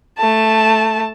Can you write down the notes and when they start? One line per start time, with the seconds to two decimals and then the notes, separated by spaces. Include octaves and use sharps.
0.19 A3 A5